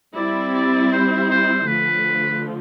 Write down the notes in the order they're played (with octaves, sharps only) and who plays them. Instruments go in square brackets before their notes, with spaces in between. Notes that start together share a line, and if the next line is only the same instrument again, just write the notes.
[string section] G3 C4 E4 [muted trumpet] D5
[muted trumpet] D5
C5
C5
[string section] D3 F3 A3 [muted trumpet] B4